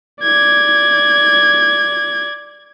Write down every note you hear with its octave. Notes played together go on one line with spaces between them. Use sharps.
D5 G#6